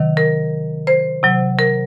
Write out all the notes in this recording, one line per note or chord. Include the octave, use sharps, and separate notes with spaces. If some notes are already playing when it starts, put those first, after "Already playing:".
Already playing: C3 D#3 F#3
A#4
C5
C3 F#3
A#4